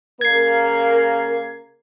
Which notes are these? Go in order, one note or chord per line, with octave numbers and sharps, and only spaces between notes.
C#3 A#3 A#4 G#6 C7